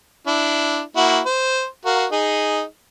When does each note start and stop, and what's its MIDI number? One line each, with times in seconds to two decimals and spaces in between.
0.27 0.81 62
0.27 0.81 64
0.96 1.20 58
0.96 1.20 64
0.96 1.20 66
1.26 1.65 72
1.85 2.06 66
1.85 2.06 70
1.85 2.06 77
2.12 2.63 63
2.12 2.63 68